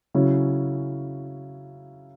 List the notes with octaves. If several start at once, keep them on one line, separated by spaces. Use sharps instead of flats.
C#3 F#3 C#4 E4